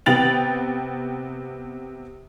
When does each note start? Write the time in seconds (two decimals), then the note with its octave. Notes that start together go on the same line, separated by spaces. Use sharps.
0.06 C3 B3 G5 A6 F7 F#7